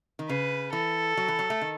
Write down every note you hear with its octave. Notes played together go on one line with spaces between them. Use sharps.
D#3
C#3 B4
E3 A4
F#3
E3
F#3
A3
D#3